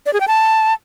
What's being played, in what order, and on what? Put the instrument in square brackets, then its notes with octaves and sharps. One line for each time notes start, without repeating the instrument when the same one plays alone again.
[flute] D5
G#4
G5
A5